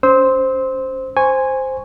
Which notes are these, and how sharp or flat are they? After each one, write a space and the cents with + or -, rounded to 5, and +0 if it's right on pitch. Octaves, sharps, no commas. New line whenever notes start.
C#4 +25 C5 +0 E6 -30
C5 +0 G#5 -10 C#6 +0